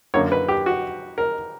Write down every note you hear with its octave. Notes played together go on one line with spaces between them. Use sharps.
F#2 D3 A#3 C#5
B4
G4
F#4
A#4